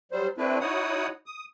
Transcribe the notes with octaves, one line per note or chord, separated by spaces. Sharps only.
F#3 G3 C5
A3 C4 D4 E4 B4
D#4 E4 F#4 C#5 F#5 D#6
D#6